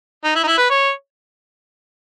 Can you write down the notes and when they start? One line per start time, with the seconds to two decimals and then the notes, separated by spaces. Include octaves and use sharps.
0.24 D#4
0.36 E4
0.43 D#4
0.47 E4
0.58 B4
0.70 C#5